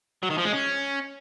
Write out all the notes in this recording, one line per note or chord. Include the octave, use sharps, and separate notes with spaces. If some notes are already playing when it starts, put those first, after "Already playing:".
F#3
D#3
F3
G#3
C#4